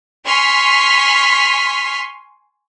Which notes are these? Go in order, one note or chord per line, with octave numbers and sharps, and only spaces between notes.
G#5 C6 C#6 F6 B6